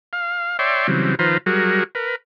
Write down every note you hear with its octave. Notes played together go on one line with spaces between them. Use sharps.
F5
C#5 D5 E5 G5 C6
C#3 E3 F#3 G3 C4
D#3 F3 F4 B4 C5 A#5
F#3 G3 F#4 G#4 A#4
A#4 B4